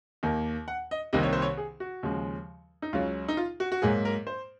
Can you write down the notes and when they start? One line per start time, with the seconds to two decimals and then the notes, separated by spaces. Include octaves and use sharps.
0.23 D#2 D#3 A#3
0.68 F#5
0.91 D#5
1.13 C2 C3 D#3 A#3 D#5
1.23 C#5
1.33 C5
1.42 C#5
1.57 G#4
1.80 F#4
2.03 D#2 C#3 F3 G#3
2.82 D#4
2.93 C#2 C#3 F#3 F4
3.28 D#4
3.37 F4
3.60 F#4
3.72 F#4
3.82 G#2 F#3 A#3 G#4
4.05 A#4
4.27 C5